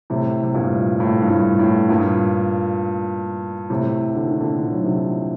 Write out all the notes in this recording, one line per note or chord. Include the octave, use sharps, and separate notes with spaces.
A2 C3
C3
G2 A#2
A2
G2
A2
A2
G2 A#2
A2 C3
D3
D#3
A#2 D3
D#3
F#3
C3 D#3